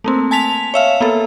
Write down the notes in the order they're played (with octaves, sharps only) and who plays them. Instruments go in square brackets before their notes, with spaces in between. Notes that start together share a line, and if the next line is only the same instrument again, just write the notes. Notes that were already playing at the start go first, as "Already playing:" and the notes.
[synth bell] A3 A#3 C4
G#5 A5 B6 F7
C#5 E5 F5
A#3 B3 A4